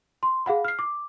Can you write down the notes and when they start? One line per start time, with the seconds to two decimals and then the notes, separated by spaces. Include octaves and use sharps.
0.23 C6
0.46 G#4 F5 F#5 B5
0.65 F6 C7
0.79 D6